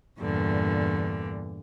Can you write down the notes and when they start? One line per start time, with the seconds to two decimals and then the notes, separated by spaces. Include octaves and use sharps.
0.18 E2 G2 A#2 D3